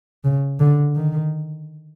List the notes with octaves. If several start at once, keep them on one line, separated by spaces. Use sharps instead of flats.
C#3
D3
D#3